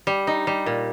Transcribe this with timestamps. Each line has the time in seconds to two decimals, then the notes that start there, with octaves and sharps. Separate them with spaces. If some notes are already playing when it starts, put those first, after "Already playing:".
0.07 G3
0.27 D#4
0.47 G3
0.66 A#2